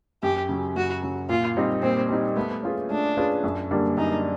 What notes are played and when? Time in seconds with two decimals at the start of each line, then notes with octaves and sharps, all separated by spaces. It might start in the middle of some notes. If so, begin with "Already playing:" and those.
0.23 F#2 G4
0.49 C#3 F#3
0.76 F#2 F#4
1.03 C#3 F#3
1.29 A#2 F4
1.57 G3 C4 D#4 G4
1.82 A#2 C4
2.09 G3 C4 D#4 G4
2.36 A3 B3
2.63 C#4 F4 G#4 B4
2.91 A3 D4
3.17 C#4 F4 G#4 B4
3.44 F#2
3.71 D3 G3 A#3 D4
3.97 F#2 D#4